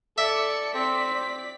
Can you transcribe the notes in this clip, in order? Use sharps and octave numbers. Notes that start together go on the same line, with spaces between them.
A4 D5 E5 C#7
C4 D5 B6